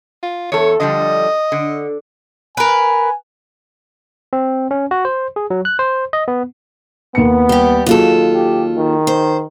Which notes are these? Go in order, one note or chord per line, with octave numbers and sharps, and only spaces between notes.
F4
E2 A4 C#5
D3 F3 G3 D#5
D3
A#4 B4 G#5
C4
C#4
F#4
C5
G#4
F#3
F#6
C5
D#5
B3
D#2 B3 C#7
G3 G4
D#2 F#3 F4 G#4 A4
G4
D#3
C5